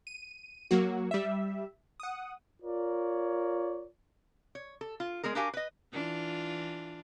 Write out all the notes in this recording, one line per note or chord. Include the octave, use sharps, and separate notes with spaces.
D#7
F#3 A#3 F#4
G3 E5
F#5 D#6
F4 A#4 C#5 D5
C#5
A4
F4
G#3 B3 G#4 A#4
D4 F#4 G4 A#4 F5 G#5
B4 D#5
E3 D4 F4